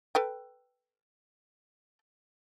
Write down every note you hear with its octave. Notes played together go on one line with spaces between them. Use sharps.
A4 B4 G5